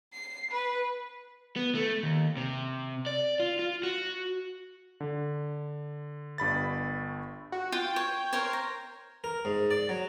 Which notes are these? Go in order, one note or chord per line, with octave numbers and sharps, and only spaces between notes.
C7
B4
B3
A3
D#2
C3
D5
F4
F4
F#4
D3
G1 G2 B5 A6
F#4
F4 G5
C#5
A#4 C5 C#5
A#5
A#4
G#2
D5
F#3